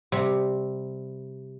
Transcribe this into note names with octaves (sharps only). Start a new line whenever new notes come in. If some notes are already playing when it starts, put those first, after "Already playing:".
C3 G3